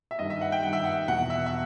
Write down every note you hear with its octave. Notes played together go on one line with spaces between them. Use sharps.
E5
G2 D#3 D#5
E5
F#5
G5
G2 D#3 F#5
E5
F#5
E2 B2 F#5
E5
E5